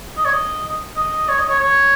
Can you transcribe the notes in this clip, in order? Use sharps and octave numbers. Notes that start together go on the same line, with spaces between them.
D#5
C#5
D#5
D#5
C#5
D#5
C#5
C#5